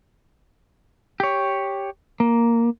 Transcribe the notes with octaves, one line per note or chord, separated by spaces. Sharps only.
G4 C#5
A#3